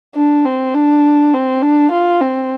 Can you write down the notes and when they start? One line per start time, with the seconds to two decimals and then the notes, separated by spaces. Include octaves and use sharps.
0.15 D4
0.45 C4
0.74 D4
1.33 C4
1.62 D4
1.92 F4
2.21 C4